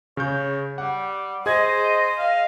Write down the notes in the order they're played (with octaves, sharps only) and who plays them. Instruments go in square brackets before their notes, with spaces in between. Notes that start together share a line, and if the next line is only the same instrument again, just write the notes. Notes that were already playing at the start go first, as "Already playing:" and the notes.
[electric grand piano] C#3 G6 [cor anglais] C#5
[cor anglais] G3 [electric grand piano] F#5
[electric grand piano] G#4 G#6 [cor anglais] C5 [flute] D#5
[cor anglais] F5